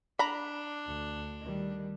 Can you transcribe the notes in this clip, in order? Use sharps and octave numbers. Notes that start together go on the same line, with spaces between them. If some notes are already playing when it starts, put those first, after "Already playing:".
D4 A#5 B5
D2
D#3 G3